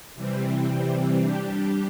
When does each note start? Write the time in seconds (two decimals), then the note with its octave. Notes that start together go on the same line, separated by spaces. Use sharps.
0.15 C3 E3 G3 C4
1.20 G3 D4 G4